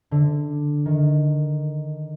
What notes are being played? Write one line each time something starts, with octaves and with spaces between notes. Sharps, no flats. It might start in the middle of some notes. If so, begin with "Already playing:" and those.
D3
D#3